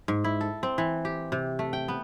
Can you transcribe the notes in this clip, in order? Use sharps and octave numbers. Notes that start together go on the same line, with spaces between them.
G#2
E4
A4
C4
E3
G4
C3
A3
G5
B3